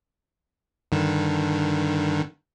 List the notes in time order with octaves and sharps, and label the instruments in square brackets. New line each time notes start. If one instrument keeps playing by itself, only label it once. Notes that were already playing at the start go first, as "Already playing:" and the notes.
[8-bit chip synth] G2 D3 D#3